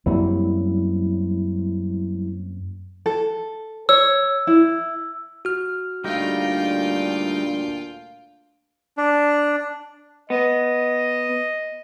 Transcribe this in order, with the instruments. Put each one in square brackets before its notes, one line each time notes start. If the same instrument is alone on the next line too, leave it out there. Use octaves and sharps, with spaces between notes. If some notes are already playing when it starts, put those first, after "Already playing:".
[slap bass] F#2 A#3 C4 [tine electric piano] F#3 G3 E4
[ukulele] A4
[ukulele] C#5 [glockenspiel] E6
[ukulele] E4
[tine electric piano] F#4 F6
[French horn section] D2 A#2 D4 [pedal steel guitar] G3 A3 D#4 [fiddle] F4 G5
[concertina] D4
[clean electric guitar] B3 [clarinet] D#5